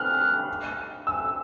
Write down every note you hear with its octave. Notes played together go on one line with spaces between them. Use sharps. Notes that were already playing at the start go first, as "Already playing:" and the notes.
Already playing: F6 F#6
E6